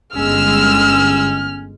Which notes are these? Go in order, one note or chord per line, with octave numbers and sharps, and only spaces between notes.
G1 G#3 C#4 E6 F6